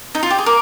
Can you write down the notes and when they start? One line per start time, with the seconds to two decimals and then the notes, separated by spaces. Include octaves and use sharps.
0.15 D#4
0.23 F4
0.30 G4
0.39 G#4
0.46 A#4 D6